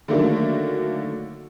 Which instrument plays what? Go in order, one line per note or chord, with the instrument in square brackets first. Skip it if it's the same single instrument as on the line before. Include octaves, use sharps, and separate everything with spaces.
[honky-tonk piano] D3 D#3 F#3 A3 A#3 D4